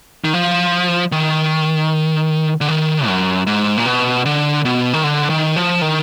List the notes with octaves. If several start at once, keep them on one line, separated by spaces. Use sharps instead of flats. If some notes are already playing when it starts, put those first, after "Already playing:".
D#3
F3
D#3
D3
D#3
F#2
G#2
A#2
B2
D3
B2
D#3
D3
D#3
F3
D#3